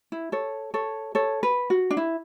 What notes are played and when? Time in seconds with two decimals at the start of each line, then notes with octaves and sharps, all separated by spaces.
0.12 E4
0.32 A4 C#5
0.74 A4 C#5
1.15 A4 C#5
1.43 B4
1.70 F#4
1.90 D4
1.97 E4